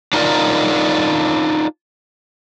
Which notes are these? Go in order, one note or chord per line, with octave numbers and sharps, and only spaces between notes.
D4 D#4 F4 A#4 D5